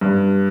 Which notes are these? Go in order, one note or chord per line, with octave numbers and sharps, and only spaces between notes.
G2